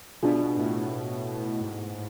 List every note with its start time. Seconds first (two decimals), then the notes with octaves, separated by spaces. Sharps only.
0.22 B2 D4 F4 G#4
0.57 A2
1.60 G#2
1.94 A2